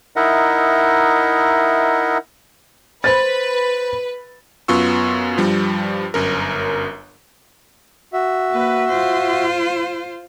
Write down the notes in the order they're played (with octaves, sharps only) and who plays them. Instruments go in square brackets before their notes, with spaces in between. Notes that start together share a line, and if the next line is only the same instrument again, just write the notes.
[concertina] D#4 E4 A#4 D#5 E5 F#5
[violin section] B4 [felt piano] C5 A6
[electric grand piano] F#2 B3 F4 C#6 E6
G2 F3 G3
G1 F#2 A#4
[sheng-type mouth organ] F#4 E5
[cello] A#3 B4
F4 C5